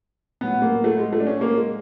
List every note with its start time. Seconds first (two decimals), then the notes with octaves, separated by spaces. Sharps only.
0.41 A2 F#3 B3
0.62 A#3
0.84 A3
0.98 G#3
1.13 A3
1.20 D4
1.27 C#4
1.41 A#3
1.56 G#3